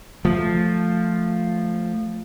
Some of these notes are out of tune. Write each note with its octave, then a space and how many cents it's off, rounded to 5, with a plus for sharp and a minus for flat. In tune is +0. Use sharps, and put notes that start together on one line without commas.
F3 +0 A3 +0